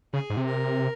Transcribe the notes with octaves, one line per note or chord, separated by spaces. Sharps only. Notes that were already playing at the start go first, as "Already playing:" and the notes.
C#3 G#4
G#2
C3
A#4